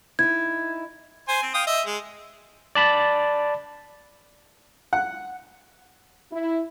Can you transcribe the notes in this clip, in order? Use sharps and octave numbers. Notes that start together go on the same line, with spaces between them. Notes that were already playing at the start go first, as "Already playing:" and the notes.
D#4 E4 G#6
C5 G#5
C4
F5 G5 D#6
D#5 E5
G#3
D5 A5 B5
F#5
E4